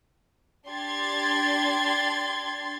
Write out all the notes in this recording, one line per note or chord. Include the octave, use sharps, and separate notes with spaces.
D4 G4 C6 G#6 A6